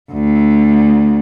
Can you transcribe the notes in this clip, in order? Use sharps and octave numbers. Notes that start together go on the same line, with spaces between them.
D2